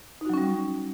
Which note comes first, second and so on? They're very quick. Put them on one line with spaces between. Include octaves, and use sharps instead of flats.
D#4 F#4 F#3 C#4 G3